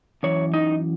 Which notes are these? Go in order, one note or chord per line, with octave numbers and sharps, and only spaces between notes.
F#2 E3 C#5
D#4 D#5